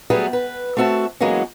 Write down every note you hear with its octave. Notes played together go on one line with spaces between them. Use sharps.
F#3 G3 A3 B3 G#4 B4
B4
A3 C4 F#4 E5 A5
E3 F#3 G#3 A#3 B3 C#4